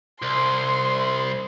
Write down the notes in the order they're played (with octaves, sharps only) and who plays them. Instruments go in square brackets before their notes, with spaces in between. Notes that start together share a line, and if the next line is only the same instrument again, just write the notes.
[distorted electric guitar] C2 [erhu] C6